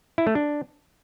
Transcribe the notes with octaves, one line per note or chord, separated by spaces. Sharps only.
E4
A3
D4